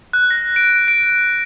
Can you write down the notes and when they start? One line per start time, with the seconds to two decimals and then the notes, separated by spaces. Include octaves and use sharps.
0.13 F#6
0.31 A#6
0.56 D7
0.88 D7